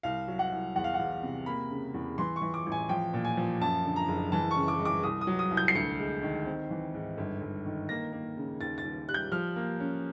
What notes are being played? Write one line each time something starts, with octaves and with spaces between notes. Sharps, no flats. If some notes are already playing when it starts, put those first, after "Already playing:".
C2 F5
F#3
F#5
C2
E2 F#5
F5
F#5
E2
C3
A#3 B5
C#3
E2
E3 C6
C#6
E3
D6
A1
G#5
F3 G5
A#2
G#5
F3
F#2 A5
D3
A#5
F#1
E3 A5
C#3 C#6
D6
G#3
D6
C2 D#6
D#6
F#3
D#6
C2
G6
C7
D2 C#7
G#3
D#3
C4
E3
G#2
G1
G1
D#3
A#3 A#6
A#3
C#3
D#2 A6
A6
D#2
G3 F#6
G6
F3 F6
A#3
C#4